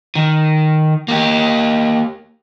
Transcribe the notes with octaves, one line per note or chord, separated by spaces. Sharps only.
D#3
A#3 G4